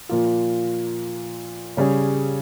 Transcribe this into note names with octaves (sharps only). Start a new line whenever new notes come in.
A#2 F3 A#3 F4
C#3 G3 C#4 G#4